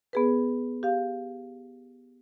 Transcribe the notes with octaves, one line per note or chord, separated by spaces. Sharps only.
B3 G#4 B4
G4 F5